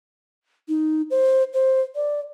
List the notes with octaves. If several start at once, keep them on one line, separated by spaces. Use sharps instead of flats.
D#4
C5
C5
D5